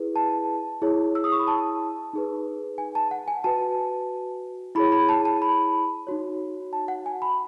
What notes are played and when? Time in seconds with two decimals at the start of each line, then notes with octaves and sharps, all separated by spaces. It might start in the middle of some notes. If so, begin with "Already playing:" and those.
Already playing: E4 G#4 B4
0.16 A5
0.82 E4 G#4 C#5
1.15 E6
1.24 D#6
1.32 C#6
1.39 B5
1.47 A5
2.13 D#4 G#4 B4
2.78 G#5
2.95 A5
3.11 F#5
3.28 G#5
3.44 F#4 B4 A5
4.75 E4 G#4 C#5 B5
4.92 B5
5.09 A5
5.25 A5
5.42 B5
6.07 D#4 F#4 C#5
6.73 A5
6.88 F#5
7.06 G#5
7.22 B5